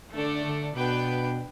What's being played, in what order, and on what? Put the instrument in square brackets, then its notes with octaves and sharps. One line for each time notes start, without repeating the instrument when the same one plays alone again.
[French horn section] D3 [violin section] A3 D4 A4 D5
[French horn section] D3
[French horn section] B2 [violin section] B3 D4 B4 G5